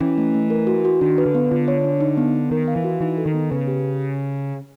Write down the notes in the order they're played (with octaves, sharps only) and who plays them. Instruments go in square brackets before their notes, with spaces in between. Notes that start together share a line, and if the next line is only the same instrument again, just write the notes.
[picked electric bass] E3 [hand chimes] C#4
[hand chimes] A3
A3
A#4
F#4
F#4
[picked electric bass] D#3 [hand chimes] D4
[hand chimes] B4
[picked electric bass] D3
[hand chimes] B3
[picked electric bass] D3 [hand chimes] F4
[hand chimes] C#5
D4
D#4
B3
B3
[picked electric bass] D#3 [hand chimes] A#4
[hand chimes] F5
[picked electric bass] E3
[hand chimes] F#4
[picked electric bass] E3 [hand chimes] D#4
[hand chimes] A4
[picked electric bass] D#3
[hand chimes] B3
[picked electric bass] C#3 [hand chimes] B4
[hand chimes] G4